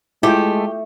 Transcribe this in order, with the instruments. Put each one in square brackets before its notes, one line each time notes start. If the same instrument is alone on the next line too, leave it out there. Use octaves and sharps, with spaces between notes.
[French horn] G#3 [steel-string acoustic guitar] A3 [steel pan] E4 F4 G5 [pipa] G4